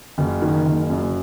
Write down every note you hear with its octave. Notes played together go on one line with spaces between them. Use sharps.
F#1
D#3
F#1
F#2